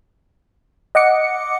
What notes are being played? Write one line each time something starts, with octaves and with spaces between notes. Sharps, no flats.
D#5 F#5 D6 C#7